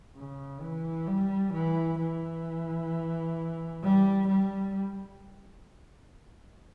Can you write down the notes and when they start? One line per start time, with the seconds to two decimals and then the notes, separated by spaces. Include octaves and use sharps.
0.16 C#3
0.61 E3
1.07 G3
1.53 E3
1.99 E3
3.83 G3
4.28 G3